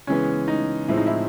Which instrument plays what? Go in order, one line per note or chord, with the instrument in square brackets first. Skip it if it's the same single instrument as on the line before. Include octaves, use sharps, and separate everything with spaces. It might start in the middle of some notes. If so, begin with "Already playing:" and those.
[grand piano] C#3 E3 G#3 B3 [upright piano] C#4
[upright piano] D#4
[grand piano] A2 F3 G#3 C4 [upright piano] E4
[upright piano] D#4
E4